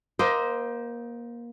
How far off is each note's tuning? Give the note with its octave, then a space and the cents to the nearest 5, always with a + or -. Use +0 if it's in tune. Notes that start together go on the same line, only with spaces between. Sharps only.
A#3 +25 C5 -10 D#5 +20